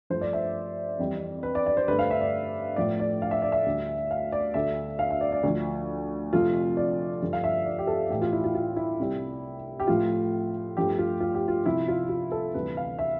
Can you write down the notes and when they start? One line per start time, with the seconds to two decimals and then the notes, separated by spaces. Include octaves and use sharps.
0.10 G2 F3 A3 C5
0.21 D5
0.33 E5
0.99 F2 E3 G3
1.43 B4
1.55 D5
1.66 D5
1.77 C5
1.88 G2 D3 A3 B4
1.99 F5
2.11 E5
2.21 D5
2.76 A2 F3 A3 D5
3.00 D5
3.22 F5
3.31 E5
3.42 D5
3.52 E5
3.66 D2 D3 G3
4.11 F5
4.32 D5
4.54 D2 D3 A3 E5
4.99 F5
5.10 E5
5.21 D5
5.32 D5
5.43 D2 D3 F3
6.33 F2 C3 F3 A3 F4
6.77 D5
7.21 G2 D3 F3 A3
7.33 F5
7.44 E5
7.66 D5
7.79 G4
7.87 A4
8.10 A2 E3 A3 G4
8.21 F4
8.32 E4
8.44 F4
8.55 F4
8.76 E4
8.99 C2 C3 G3
9.80 G4
9.87 A2 F3 A3 F4
10.77 G2 F3 A3 G4
10.99 F4
11.20 F4
11.35 G4
11.48 F4
11.66 C2 C3 F3 E4
11.88 F4
12.09 F4
12.32 A4
12.54 D2 C3 E3 G3 B4
12.77 F5
12.99 E5